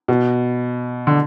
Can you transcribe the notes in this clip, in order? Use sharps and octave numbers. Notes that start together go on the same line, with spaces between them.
B2
D3